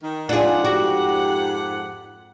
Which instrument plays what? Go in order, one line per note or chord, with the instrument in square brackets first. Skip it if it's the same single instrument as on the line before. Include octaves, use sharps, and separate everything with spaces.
[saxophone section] D#3
[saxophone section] F2 G#2 F#5 [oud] D4 G#4 [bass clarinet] F4
[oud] F#4 [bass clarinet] G4